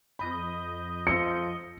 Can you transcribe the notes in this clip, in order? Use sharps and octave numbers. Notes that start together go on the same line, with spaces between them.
F2 D#5 B5 G6
F3 D#6 E6 A#6 C#7